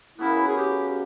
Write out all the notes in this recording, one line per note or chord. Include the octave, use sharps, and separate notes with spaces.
F#2 C#3 F#3 B3 E4
G#4
G4